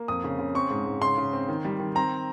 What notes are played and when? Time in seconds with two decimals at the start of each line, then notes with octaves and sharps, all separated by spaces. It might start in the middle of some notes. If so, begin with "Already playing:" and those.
Already playing: A#3
0.08 F2 D#6
0.24 C#3
0.39 C#3
0.54 C4 C#6
0.70 G#2
0.86 G#2
1.01 C#3 C6
1.17 C#3
1.33 C4
1.48 D#3
1.65 G3
1.79 D#3
1.95 C4 A#5